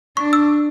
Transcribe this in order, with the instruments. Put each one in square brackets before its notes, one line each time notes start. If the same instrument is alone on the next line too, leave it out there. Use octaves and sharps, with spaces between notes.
[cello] D4 [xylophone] C#6
[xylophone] E6